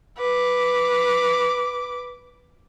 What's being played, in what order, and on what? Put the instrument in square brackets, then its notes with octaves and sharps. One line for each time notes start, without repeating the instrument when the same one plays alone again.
[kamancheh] B4 D6